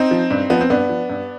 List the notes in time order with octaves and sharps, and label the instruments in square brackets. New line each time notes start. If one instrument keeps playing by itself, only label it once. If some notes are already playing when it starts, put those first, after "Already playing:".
Already playing: [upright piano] C4 D#4
F3
G2
F3 B3
C4
G2 B3 D4
F3
G2